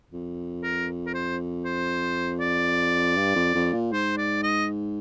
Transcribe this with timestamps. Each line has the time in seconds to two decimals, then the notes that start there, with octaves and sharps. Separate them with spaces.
0.13 F2
0.63 A#4
1.07 A#4
1.14 C5
1.65 C5
2.40 D5
3.17 G2
3.36 F2
3.55 F2
3.73 A#2
3.93 G#2 C5
4.18 D5
4.43 D#5